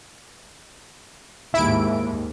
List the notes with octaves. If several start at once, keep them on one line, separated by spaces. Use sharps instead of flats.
D#2 G#2 E4 D7